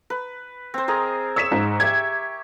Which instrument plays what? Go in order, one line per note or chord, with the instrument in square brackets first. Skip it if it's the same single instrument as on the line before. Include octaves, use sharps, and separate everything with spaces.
[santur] B4
C4 C5
G#4 A#4 D#5
[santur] C#5 [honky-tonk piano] E6 B6 E7
[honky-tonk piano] G#2
[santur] G4 E5 [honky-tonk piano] G#6